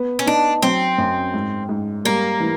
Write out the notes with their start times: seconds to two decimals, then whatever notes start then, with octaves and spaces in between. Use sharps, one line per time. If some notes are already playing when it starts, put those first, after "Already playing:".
Already playing: B3
0.19 C#4
0.26 D4 D#4
0.62 F#3 C4
0.98 F#2
1.34 G#2
1.69 G#2
2.05 G3 A#3
2.40 E3